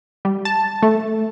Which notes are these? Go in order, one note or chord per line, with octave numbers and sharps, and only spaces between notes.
G3
A5
A3